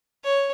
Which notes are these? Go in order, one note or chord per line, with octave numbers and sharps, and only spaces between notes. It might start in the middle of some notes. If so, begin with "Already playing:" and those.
C#5